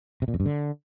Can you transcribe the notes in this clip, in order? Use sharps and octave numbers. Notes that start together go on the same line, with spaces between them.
C3
A#2
F2
G2
D3